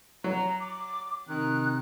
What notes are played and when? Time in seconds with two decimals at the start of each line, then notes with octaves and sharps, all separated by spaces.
0.24 F#3 A#5
0.60 D6
1.29 C3 D#3 C4 F#6